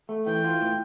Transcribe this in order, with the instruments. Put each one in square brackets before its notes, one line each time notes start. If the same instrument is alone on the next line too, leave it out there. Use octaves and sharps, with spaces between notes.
[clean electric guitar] A3
[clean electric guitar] E3 [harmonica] G5
[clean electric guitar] F4
A2